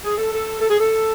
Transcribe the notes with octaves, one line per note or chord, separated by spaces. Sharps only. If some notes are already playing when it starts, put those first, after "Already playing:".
G#4
A4
A4
A4
G#4
A4